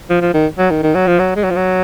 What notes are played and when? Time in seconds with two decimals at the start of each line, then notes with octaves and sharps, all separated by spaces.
0.10 F3
0.22 F3
0.34 D#3
0.59 F#3
0.71 D#3
0.83 D#3
0.95 F#3
1.07 F3
1.19 F#3
1.36 G#3
1.44 F#3
1.51 F3
1.56 F#3